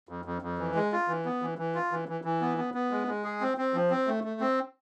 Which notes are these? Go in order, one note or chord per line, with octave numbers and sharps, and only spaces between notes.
F2
F2
F2
E3
G#3
F4
E3
B3
E3
E3
F4
E3
E3
E3
B3
B3
B3
G#3
G#3
G#4
C4
C4
F3
C4
A3
A3
C4